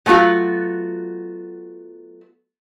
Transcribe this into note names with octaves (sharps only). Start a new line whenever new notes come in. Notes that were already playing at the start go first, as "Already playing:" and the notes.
F#3 A3 B3 F4 F#4